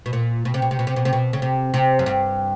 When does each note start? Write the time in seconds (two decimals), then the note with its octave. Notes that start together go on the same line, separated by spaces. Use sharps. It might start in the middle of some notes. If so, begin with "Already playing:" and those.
0.06 B2
0.13 A#2
0.45 B2
0.54 C3
0.62 B2
0.71 C3
0.79 B2
0.87 C3
0.96 B2
1.05 C3
1.13 B2
1.33 C#3
1.42 C3
1.74 C3
1.99 F#2
2.06 G2